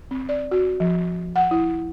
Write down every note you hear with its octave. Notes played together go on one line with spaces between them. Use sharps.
C4
D5
F#4
F3
F#5
E4